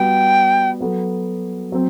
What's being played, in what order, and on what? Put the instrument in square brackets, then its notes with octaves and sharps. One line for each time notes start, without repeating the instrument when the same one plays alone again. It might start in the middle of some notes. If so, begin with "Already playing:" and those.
Already playing: [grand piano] G3 B3 F#4 [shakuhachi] G5
[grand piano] F#3 B3 F#4 A4
F#3 C4